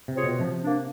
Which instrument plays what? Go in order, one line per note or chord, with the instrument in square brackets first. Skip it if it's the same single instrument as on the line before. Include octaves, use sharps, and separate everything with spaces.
[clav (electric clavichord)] C3
[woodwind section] C4 F4 G#4 C#5
[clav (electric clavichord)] B2
[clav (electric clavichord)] C3 [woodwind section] F3
[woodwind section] A#3 D4